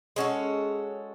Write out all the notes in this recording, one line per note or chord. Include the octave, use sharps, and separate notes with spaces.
G#3 C#4 F#4 A4